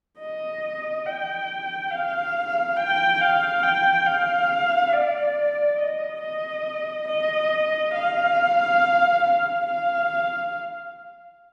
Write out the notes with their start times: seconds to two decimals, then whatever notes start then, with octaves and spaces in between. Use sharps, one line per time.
0.19 D#5
1.05 G5
1.91 F5
2.76 G5
3.21 F5
3.63 G5
4.06 F5
4.92 D5
5.79 D#5
6.21 D#5
7.08 D#5
7.94 F5
9.23 F5
9.66 F5